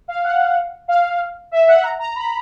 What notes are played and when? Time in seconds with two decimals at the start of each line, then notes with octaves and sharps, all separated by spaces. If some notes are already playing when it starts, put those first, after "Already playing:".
0.08 F5
0.24 F#5
0.88 F5
1.52 E5
1.67 F#5
1.83 A#5
1.99 A#5
2.15 B5